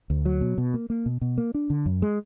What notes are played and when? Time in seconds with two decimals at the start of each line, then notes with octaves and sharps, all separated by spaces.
0.10 D2
0.25 F#3
0.41 B2
0.58 B2
0.74 A#3
0.90 A#3
1.06 B2
1.21 B2
1.38 A#3
1.54 D4
1.70 D3
1.86 F#2
2.02 G#3